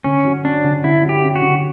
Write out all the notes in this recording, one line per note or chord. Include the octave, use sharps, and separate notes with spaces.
D3 C#4
F#3
C#4 D4
D3
D3 E4
F#3
G4
C#4
F#4
D3